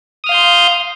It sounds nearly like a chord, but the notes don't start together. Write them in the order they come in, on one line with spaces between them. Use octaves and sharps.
D#6 F6 F5 G6 C6